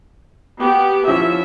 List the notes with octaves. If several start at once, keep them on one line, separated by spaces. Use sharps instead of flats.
B3 G4
F3 C#4 E4 E5